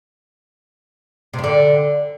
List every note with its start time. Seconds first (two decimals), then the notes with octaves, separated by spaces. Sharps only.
1.33 C3
1.39 G2
1.44 D3